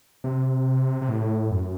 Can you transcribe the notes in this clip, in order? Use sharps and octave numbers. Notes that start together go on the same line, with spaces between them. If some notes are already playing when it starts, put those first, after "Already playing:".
C3
C3
A2
F#2